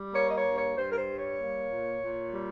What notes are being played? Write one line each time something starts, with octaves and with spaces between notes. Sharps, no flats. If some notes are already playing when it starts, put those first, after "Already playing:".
Already playing: G3
A#3 C#5
D#5
C#5
G2
C#5
G2 C5
A#4
C5
G3
C#5
A#3
A#2
A#2
G3